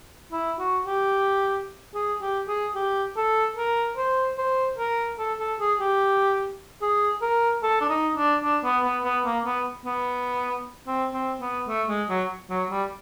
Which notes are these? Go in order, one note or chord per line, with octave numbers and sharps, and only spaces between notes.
E4
F#4
G4
G#4
G4
G#4
G4
A4
A#4
C5
C5
A#4
A4
A4
G#4
G4
G#4
A#4
A4
D4
D#4
D4
D4
B3
B3
B3
A#3
B3
B3
C4
C4
B3
A3
G#3
F#3
F#3
G3